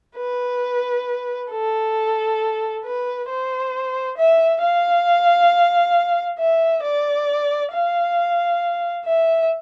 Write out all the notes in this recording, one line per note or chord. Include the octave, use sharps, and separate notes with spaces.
B4
A4
B4
C5
E5
F5
E5
D5
F5
E5